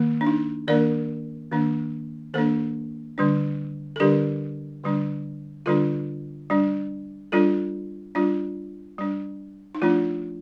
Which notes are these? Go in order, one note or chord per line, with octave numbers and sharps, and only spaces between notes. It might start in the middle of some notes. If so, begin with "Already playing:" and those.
Already playing: D#3 A#3
D4
D#4
D#3 A#3 D4 A#4 D5
D#3 A#3 D4
D#3 A#3 D4 A4 C5
D3 G3 D4
A4
D3 G3 D4 G4 A#4
D3 G3 D4
D3 G3 D4 F4 A4
G3 D4
G3 D4 F4 A4
G3 D4 F4
G3 D4
D#4
F3 A3 D4 F4